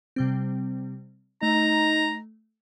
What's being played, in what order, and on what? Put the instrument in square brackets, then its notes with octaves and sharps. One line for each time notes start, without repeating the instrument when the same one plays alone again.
[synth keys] C3 G3 C4
[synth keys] A3 [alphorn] D#4 [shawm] A#5